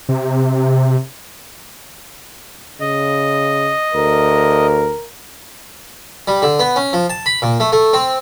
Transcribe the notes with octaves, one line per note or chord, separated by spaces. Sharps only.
C3
C#3 D#5
D2 A#4
G3
D3
B3
C#4
F3
A5
B5
A#2
A3
A3
C4